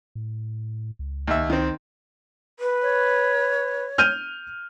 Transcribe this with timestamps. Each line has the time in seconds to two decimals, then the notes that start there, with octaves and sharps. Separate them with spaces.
0.15 A2
0.99 C#2
1.27 D#2 E5
1.50 D#3 C4
2.60 B4
2.82 C#5
3.98 F6 G6 D#7